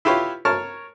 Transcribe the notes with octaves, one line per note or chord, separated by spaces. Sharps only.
E4 F4 G4 B4 C#5
A#4 C#5 A5 F6